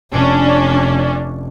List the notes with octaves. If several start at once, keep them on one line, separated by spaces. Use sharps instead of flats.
F1 C#4 D4